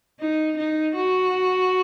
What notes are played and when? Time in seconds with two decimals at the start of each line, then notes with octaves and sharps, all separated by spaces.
0.20 D#4
0.58 D#4
0.96 F#4